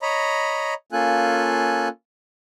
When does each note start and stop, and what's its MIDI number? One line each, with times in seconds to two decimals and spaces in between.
0.02 0.74 73
0.02 0.74 75
0.02 0.74 82
0.02 0.74 83
0.92 1.88 58
0.92 1.88 61
0.92 1.88 65
0.92 1.88 69
0.92 1.88 80
0.92 1.88 90